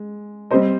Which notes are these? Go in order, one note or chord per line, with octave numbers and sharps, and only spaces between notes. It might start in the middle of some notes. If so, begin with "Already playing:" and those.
Already playing: G#3
G3 C4 G4 C5 D#5